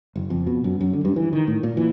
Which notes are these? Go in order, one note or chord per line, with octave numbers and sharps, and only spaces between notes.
F#1
F2
B2
F#2
F#2
D3
G2
E3
D#3
A2
A#2
E3